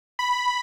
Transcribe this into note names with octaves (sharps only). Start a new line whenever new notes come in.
B5